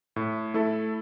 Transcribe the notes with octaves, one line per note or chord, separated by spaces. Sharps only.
A2
A3 E4 A4